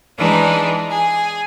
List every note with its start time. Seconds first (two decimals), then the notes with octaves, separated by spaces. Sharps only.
0.17 E3 G#3 D4 D#4 B4
0.89 G#4 G#5